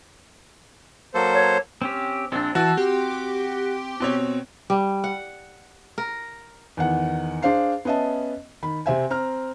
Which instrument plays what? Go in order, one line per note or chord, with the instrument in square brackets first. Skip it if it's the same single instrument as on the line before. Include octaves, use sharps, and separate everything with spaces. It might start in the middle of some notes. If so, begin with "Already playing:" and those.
[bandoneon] F#3 A#3 A4 [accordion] C5
[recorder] C#5
[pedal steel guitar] C4 C#4 G4
[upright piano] A#1 [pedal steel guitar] C4 D4
[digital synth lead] E3 [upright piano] F#4 [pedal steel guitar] A5 E6
[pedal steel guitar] C4 [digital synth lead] G4
[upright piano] B2 C4 C#5
[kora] G3
F#5
A#4
[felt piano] E2 D#3 F#5
D4 G#4 C5 F5 C7
B3 C#4 D#5 E5 A5
D#3 B5
C3 C4 E5 G#5
C4 A#5 F6